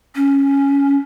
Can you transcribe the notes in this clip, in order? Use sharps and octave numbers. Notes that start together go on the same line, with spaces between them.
C#4